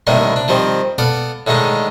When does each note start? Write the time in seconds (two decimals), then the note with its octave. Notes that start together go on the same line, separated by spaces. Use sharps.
0.07 C2 A2 D3 D#3 G3 A#3
0.36 D4
0.48 D#3 F3 G3 C4
0.98 B3 A4 D5 F5
1.47 A2 D3 D#3 G#3 D#4